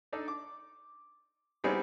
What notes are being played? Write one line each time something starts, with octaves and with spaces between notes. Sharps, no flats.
D4 D#4 A4 D5
D6
G3 B3 C4 D#4 E4 G#4